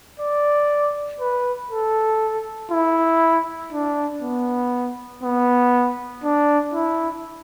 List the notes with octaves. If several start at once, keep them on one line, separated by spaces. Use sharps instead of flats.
D5
B4
A4
E4
D4
B3
B3
D4
E4